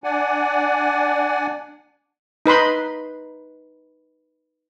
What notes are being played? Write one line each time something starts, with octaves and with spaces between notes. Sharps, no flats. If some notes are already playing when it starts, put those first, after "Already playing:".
D4 D5 F#5 G#5
D#4 B4 B5 C6